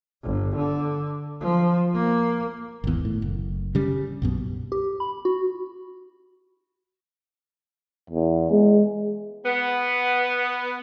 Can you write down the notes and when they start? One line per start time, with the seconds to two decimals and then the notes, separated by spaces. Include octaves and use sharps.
0.24 G1
0.56 D3
1.41 F3
1.95 A#3
2.84 G#1 E2
3.05 A2
3.22 F#1
3.75 C#3 G3
4.22 B1 F#2 B2
4.72 G4
5.00 B5
5.25 F#4
8.10 E2
8.51 G#3
9.45 B3